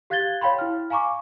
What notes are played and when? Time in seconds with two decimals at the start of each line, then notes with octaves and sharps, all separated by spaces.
0.10 G4 F5 F#6 G#6 A6 G7
0.41 C#5 F5 G5 B5 C6
0.59 E4 F6
0.90 F5 G#5 A#5 C#6 D6